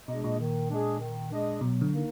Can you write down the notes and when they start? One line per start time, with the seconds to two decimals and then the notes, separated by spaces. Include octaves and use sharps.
0.08 B2 G#3 D4 G#4 D#5
0.24 A#2
0.39 D#3
0.69 G#3 D4 G#4 D#5
0.99 D#3
1.31 G#3 D4 G#4 D#5
1.61 B2 F#3
1.81 D3
1.91 A#3 D#4 A#4